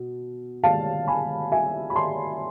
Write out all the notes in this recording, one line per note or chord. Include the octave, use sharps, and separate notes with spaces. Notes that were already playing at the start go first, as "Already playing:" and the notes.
Already playing: B2
F5 A5
G#5 B5
E5 G#5
B5
A5 C6